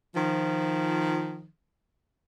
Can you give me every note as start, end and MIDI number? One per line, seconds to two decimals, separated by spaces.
0.15 1.47 51
0.15 1.47 53